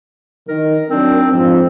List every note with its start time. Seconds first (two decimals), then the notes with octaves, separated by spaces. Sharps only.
0.48 D#3 A#4
0.89 F#3 C4 D4 A#4
1.31 F2 G#2 F3 C4